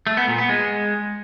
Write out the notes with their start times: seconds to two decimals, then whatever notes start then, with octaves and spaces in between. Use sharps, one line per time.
0.07 A3
0.17 B3
0.28 A#2
0.39 B3
0.49 G#3